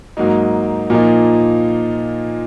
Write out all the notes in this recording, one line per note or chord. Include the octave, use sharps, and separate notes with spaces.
G#2 F#3 A#3 D#4
A#2 F3 A#3 D#4